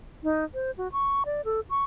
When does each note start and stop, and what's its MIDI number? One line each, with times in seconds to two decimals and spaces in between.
0.23 0.44 63
0.54 0.71 72
0.78 0.91 66
0.92 1.23 85
1.25 1.41 74
1.45 1.60 69
1.70 1.84 85